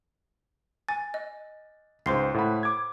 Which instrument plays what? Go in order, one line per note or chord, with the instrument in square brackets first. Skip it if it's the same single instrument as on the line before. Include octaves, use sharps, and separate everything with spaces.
[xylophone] G#5 [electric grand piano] A6
[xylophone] D#5
[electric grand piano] C#2 G#2 [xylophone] C5 C6 C7
[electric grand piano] A2 F#5 B5
D6 G#6